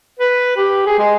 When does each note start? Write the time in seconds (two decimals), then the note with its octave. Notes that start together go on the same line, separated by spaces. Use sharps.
0.19 B4
0.57 G4
0.86 G#4
0.99 G#3